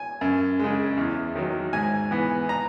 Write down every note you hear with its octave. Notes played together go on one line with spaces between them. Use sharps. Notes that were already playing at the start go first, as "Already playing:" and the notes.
Already playing: G#5
F#2
C#3 G#3
E2
D#3 F#3
G#2 G#5
E3 B3
A#5